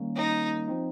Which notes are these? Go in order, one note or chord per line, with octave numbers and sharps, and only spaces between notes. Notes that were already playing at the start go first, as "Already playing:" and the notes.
Already playing: D#3 G3 A#3 C#4
D#4
F3 C4 D#4